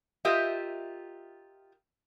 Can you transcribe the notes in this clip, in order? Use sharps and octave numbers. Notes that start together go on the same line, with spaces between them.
F4 G4 A#4 D#5 E5